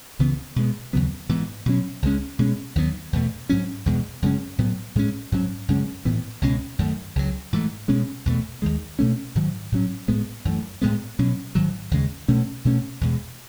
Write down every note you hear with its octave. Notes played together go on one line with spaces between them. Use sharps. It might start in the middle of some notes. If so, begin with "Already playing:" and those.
C#2 C#3 E3 B3
B2 G#3 B3
D#2 C#3 F#3 B3
G#2 E3 B3
B2 F#3 C#4
C#2 C#3 G#3 C#4
B2 G#3 C#4
D#2 D#3 F#3 B3
E2 B2 A3
G#2 F#3 C#4
E2 B2 G#3
F#2 C#3 G#3 C#4
A2 F#3 B3
A2 G#3 C#4
G#2 F#3 C#4
F#2 C#3 G#3 C#4
A2 E3 B3
C#2 B2 G#3 C#4
F#2 D#3 A3
C#2 C#3 F#3
G#2 E3 A3
B2 G#3 C#4
E2 B2 A3
D#2 D#3 G#3
B2 A3 C#4
G#2 D#3 F#3
A2 F#3 C#4
A2 G#3 B3
F#2 E3 A3
A2 G#3 B3
B2 F#3 C#4
G#2 D#3 F#3
D#2 C#3 G#3
B2 A3 C#4
B2 A3 C#4
E2 B2 G#3